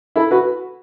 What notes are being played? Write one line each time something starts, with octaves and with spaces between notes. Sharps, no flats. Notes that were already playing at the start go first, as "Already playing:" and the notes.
E4 A4
F#4 B4